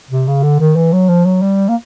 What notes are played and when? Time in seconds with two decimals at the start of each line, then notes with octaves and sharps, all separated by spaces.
0.10 C3
0.27 C#3
0.43 D3
0.60 D#3
0.76 E3
0.93 F#3
1.09 F3
1.25 F#3
1.42 G3
1.69 A#3